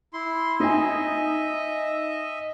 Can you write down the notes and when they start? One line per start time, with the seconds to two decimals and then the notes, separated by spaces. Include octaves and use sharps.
0.13 E4 C6
0.60 D#4 D#5 E5 G#5